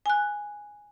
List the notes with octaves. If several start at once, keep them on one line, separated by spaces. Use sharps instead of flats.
G#5 F#6